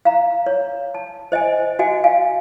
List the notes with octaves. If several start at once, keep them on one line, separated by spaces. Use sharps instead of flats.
F5 A#5
C#5
A5
C5 D#5 G5 G#5
F#4 D#5 G5 G#5
F5 G#5